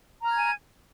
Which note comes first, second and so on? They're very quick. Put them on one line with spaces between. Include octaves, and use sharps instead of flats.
A#5 F6 G#6 G#5